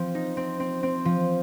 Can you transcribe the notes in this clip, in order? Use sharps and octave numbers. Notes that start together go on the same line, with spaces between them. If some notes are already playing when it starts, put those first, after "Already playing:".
Already playing: F3 C4
D#4
C4
C4
C4
F3